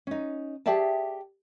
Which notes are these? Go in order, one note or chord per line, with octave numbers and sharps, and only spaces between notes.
C#4 D#4
G4 G#4 D5 E5 G5 A5